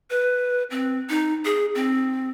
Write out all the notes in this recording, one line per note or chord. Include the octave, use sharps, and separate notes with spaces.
B4
C4
D#4
G#4
C4